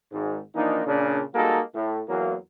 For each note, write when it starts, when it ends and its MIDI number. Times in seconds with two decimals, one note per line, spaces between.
0.13 0.39 32
0.13 0.39 44
0.55 0.84 52
0.55 0.84 53
0.55 0.84 58
0.55 0.84 62
0.55 0.84 63
0.86 1.21 46
0.86 1.21 49
0.86 1.21 62
1.35 1.61 55
1.35 1.61 56
1.35 1.61 58
1.35 1.61 63
1.35 1.61 66
1.35 1.61 69
1.75 2.01 45
2.09 2.35 40
2.09 2.35 54
2.09 2.35 58